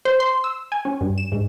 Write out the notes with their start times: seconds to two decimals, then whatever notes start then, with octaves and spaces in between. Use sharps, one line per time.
0.05 C5
0.20 C6
0.44 E6
0.72 G#5
0.85 C#4
1.01 G2
1.18 E7
1.32 G#2